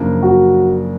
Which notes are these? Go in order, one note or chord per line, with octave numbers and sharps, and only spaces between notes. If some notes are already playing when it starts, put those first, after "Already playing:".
Already playing: F#2 C#3 F3 A#3 D4
F#4